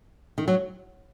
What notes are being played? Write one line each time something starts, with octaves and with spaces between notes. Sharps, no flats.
D#3
F#3